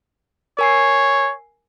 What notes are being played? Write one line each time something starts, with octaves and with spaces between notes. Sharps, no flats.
A#4 C#5 G#5 C7